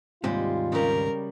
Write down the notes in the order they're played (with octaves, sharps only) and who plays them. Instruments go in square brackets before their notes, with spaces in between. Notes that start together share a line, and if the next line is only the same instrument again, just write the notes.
[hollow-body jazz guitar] D#2 G#2 C3 [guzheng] G3 G#3 [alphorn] F4
[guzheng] C#3 G3 [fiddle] A#4